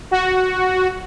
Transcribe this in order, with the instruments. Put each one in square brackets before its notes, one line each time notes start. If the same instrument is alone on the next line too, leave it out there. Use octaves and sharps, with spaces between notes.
[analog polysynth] F#4